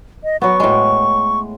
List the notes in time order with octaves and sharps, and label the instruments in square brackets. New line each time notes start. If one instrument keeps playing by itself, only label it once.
[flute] D#5
[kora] F#3 B3 [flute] C#6
[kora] A2 G#3